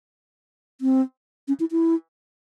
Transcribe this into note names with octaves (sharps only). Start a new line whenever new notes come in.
C4
C#4
E4
E4